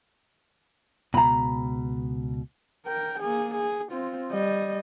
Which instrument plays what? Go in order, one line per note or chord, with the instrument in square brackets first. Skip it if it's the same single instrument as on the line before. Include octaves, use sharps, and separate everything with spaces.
[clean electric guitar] C#2 B2 [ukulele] A#5 B5
[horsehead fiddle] A#4 G5
A#3 G#4
G#4
C4 F4
G3 D#5